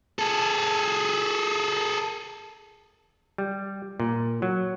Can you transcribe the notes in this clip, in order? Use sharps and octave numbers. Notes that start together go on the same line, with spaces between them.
G#4 A4
G3
A#2
F#3